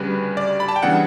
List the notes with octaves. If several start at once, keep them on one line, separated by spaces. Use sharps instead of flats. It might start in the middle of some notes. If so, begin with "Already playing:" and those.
Already playing: D2 C#3 G3 B4
D5
B5
A5
G5
C#3 E3 G3 B3 D4 F#5